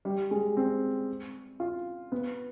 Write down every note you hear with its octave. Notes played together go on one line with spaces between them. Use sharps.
G3
G#3
C4
F4
B3